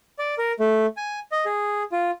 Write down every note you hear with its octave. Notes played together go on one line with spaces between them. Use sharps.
D5
A#4
A3
G#5
D#5
G#4
F4